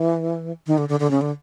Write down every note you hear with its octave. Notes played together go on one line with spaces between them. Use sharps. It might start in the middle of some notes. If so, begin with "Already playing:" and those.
Already playing: E3
D#3
D3
D3
D3
C#3
D3